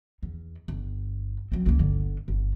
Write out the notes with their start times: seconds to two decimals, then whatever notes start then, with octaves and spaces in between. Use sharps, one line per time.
0.23 E2
0.68 G1
1.52 F#3 C4
1.66 C#2 A#3
1.79 G1 D3
2.28 G1